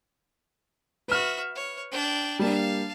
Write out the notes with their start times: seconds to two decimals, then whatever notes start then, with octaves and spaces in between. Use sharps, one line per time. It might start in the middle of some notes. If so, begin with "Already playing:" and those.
1.08 F#4 B4 E5 F6
1.55 C#5
1.92 D4 G5
2.39 G3 A#3 D4 F5 A5